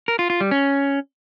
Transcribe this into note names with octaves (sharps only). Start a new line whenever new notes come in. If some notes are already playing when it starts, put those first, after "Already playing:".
A#4
F4
F4
G3
C#4